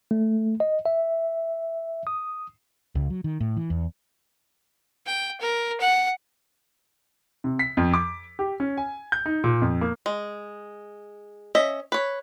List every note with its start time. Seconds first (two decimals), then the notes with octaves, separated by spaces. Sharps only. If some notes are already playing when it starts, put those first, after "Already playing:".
0.11 A3
0.60 D#5
0.86 E5
2.07 D#6
2.95 C#2
3.10 F#3
3.24 D#3
3.40 A2
3.57 E3
3.70 E2
5.06 G5
5.41 A#4
5.80 F#5
7.44 C3
7.59 B6
7.77 F2
7.94 D6
8.39 G4
8.60 C#4
8.77 G#5
9.12 G6
9.26 D#4
9.44 A#2
9.62 F2
9.81 A#3
10.06 G#3
11.55 C#4 D#5 E5
11.92 B4 C#5